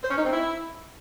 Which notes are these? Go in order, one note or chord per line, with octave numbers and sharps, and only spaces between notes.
C5
C#4
D#4
C4
E4